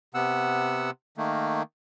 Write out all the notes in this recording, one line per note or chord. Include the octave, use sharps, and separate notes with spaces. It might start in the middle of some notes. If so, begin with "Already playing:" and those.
C3 B3 F#5 E6
D#3 A3 A#3